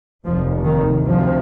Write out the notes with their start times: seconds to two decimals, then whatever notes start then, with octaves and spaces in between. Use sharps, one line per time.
0.24 F1 D#2 F3
0.65 D#3
1.05 D2 C3 F3